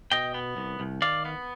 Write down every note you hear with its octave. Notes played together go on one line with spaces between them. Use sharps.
B2 D#5 G5
B3
C2
C2
D#3 D5 F5
B3